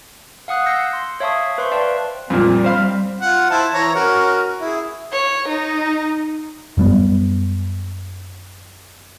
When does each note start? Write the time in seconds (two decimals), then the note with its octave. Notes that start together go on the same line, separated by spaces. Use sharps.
0.48 F5 F#5 D#6 F#6
0.66 E6 G6 A#6 C7 C#7
0.93 C6
1.20 C#5 E5 F5 A5 C#6 D#6
1.58 B4 C5 E5 C6 C#6
1.71 B4 D5 F5 G5 A5 C6
2.30 F2 A#2 G3 C4
2.64 C5 F5 B5
3.21 F4 F#5
3.50 E4 C5 A5
3.74 E3 C#5 A#5
3.95 C#4 F#4 A#4
4.61 E4 G#4
5.12 C#5
5.47 D#4
6.77 F#2 G3 B3